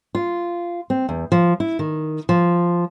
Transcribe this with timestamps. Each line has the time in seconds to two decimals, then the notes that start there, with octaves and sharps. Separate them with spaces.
0.15 F4
0.90 C4
1.09 E2
1.32 F3
1.60 E4
1.79 D#3
2.29 F3